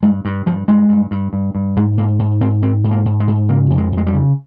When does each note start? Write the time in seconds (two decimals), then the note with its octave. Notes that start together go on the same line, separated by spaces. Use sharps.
0.03 G2 G#3
0.25 G2
0.46 G2 F3
0.68 G2 G#3
0.89 G2
1.11 G2
1.33 G2
1.55 G2
1.76 G#2 G#3
1.97 G#2 A#3
2.19 G#2
2.41 G#2 C4
2.62 G#2 C4
2.84 G#2
2.91 A#3
3.05 G#2
3.20 G#3
3.27 G#2
3.49 C#3 A#3
3.70 F2
3.78 G#3
3.92 F2
3.97 G#3
4.07 G3
4.14 C#3